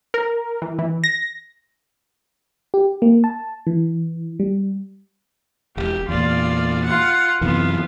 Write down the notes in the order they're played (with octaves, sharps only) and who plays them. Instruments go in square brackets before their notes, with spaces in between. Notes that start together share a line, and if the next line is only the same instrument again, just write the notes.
[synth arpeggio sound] A#4
E3
E3
A#6
[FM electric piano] G4
A#3
A5
E3
G3
[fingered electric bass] E1 [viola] G4
[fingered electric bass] E2 A#2 [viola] F4 D5
[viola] F4 F#5
[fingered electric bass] F#2 C3 E3 [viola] B3 F4